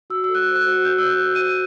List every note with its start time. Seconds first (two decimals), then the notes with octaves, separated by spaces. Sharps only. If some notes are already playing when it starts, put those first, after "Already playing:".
0.10 F#4 E6
0.24 A4 E6
0.35 F#6
0.47 C5
0.56 F#6
0.60 E6
0.67 F#4
0.85 F#4 G6
0.98 E6
1.04 F#4
1.10 F#6
1.23 F#4
1.35 D#7
1.41 C5